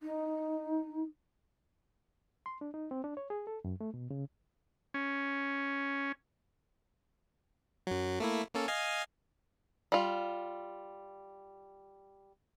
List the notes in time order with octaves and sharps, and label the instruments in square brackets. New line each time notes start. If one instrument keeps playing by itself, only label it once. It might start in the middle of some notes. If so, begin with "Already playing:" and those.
[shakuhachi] D#4
[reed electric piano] C6
D4
D#4
C4
D4
C#5
G#4
A4
F#2
A3
B2
C#3
[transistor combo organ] C#4
[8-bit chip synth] F#2 F#3
A3 A#3 E4
A#3 C#4 A4
D#5 F5 G#5
[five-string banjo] G3 F4